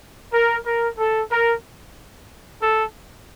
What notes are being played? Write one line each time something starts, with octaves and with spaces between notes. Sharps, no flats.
A#4
A#4
A4
A#4
A4